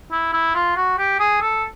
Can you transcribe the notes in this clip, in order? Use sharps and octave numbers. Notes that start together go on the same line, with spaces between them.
E4
E4
F4
F#4
G4
G#4
A4